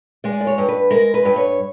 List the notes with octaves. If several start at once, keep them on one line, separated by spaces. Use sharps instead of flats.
G#3 D5
D5
C#5
G2
B4
G#3 A#4
B4
G2
C#5